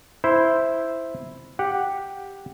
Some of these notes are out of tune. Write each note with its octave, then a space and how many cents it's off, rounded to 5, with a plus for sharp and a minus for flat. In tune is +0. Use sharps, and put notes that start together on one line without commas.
E4 +0 C5 +0
G4 +5 F#5 +0